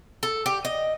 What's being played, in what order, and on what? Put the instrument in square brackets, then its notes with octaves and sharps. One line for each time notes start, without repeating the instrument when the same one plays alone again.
[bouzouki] A4
G4
D#5